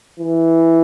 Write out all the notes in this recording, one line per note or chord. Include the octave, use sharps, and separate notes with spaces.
E3